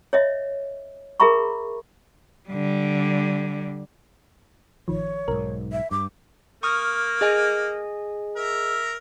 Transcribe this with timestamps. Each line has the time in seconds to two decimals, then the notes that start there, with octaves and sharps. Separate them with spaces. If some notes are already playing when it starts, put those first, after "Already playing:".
0.13 C#5 D#5 E5
1.20 G#4 A#4 E5 A#5 B5 C#6
2.49 D3 G3
4.88 A1 D#3 F3 C#5
5.28 B1 G#2 A#4
5.72 E5
5.91 G2 D6
6.63 A#3 C#6 D#6 F6
7.21 G#4 D#5 G#5
8.36 A#4 E5